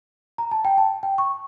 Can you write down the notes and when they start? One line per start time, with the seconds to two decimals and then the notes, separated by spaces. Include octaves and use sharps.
0.38 A#5
0.51 A5
0.65 G5
0.78 A5
1.03 G5
1.18 C#6